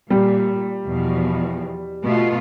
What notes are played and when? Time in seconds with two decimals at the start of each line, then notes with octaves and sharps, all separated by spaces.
0.10 A#2 G3
0.85 E2 B2 F3
2.03 B2 A3 F4